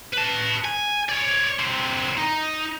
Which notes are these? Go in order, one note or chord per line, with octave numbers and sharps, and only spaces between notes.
B4 A5
G#5
C#5 D5
D3 C4
D#4